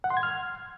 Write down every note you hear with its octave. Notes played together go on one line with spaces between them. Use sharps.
F#5
C6
G#6
F6